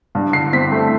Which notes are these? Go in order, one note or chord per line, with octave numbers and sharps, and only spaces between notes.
G2
D3 C7
C4 B6
A3